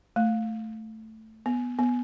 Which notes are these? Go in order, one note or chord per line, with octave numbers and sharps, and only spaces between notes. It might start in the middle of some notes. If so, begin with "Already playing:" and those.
A3
B3
B3